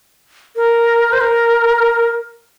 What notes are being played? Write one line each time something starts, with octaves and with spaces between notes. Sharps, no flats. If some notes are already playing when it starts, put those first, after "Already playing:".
A#4
C5
A#4